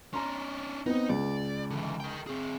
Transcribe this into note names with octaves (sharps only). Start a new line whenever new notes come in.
C#4 D4 A#5 C6
B3 C4 D#4
C#2 D5
D3 E3
A#4 G5
C4 G#4